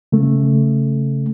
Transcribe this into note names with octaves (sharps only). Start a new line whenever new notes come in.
C#3 A3